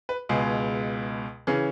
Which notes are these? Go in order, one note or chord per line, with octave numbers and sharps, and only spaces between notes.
B4
C#2 B2 G#3 G#4
C#3 E3 C#4 G#4